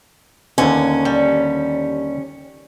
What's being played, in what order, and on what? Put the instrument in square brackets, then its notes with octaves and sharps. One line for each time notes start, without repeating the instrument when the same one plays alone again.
[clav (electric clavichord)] D#2 D3 [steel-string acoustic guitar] C#4
[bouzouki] G3